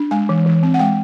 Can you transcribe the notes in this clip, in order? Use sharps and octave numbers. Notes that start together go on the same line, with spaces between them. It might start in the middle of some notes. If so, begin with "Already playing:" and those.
Already playing: D4
G#3 G#5
E3
E3
C4
F#5
G#3 G5